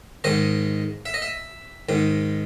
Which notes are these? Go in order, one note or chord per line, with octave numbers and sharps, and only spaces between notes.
G#2 D#3 D#5
E5
D#5
E5
G#2 D#3